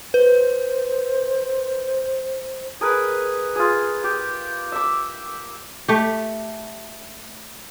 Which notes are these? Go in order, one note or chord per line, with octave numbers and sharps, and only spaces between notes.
B4 C5
G#4 A#4 B4
F4 G#4
G4
E5 D6
A3 G4